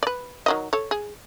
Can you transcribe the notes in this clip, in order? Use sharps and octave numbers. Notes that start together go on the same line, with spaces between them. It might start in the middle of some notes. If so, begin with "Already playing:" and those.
B4 D5
D#3 F#3 D#5
A4 C#5
G#4